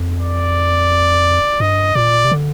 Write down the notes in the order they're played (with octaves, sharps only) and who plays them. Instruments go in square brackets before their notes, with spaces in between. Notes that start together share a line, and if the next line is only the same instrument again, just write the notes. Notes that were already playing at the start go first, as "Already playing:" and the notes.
Already playing: [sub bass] F2
[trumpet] D5
[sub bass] G2 [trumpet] D#5
[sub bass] A#2 [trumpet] D5
[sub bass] C3
D3